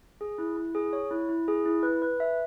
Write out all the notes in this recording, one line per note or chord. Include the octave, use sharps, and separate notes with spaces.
G#4
E4
E4
G#4
C#5
E4
E4
G#4
E4
B4
B4
E5